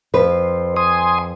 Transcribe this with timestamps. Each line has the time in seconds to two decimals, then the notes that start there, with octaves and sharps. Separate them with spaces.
0.14 F2 B4 C5
0.77 G#5 C6 D#6